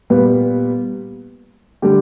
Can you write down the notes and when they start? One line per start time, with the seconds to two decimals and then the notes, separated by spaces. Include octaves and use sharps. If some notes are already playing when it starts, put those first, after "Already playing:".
0.10 A#2 G3 B3 B4
1.82 D3 G3 G4